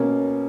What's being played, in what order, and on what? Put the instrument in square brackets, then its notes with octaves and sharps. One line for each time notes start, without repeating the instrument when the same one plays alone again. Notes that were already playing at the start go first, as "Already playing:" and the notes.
Already playing: [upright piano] B2 A#3 C#4